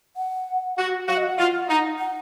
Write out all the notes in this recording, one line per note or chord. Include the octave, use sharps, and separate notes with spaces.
F#5
F#4
F#4 F5
D#5
F#5
F4
D#4
F#5